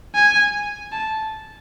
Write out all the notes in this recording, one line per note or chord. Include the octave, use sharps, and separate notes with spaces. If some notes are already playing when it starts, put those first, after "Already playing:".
G#5
A5